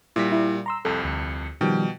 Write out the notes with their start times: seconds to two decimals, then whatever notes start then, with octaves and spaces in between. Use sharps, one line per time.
0.16 A#2 G3 E4 B6
0.32 E4
0.66 A#5 C6 E6
0.85 C2 F2 A4
1.04 D2 C#7
1.61 B2 D#3 F3 G3 G5